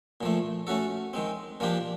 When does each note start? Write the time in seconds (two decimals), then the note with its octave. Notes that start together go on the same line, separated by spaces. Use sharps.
0.21 A#2 F3 A3
0.67 A3 C#4 F#4 A4
1.13 D#3 G#3 C4
1.60 A#2 F3 A#3 D4 G4